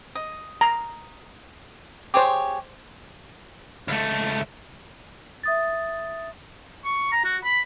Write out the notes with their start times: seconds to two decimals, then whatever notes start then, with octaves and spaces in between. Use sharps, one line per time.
0.15 D#5
0.61 A#5
2.14 G4 G#4 C5 C#5 D6
3.88 C#2 A3
5.43 E5 D#6 A6
6.85 C#6
7.12 A#5
7.25 F#4
7.44 B5